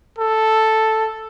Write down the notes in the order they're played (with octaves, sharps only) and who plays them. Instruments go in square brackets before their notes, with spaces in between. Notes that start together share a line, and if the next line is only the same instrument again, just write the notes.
[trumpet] A4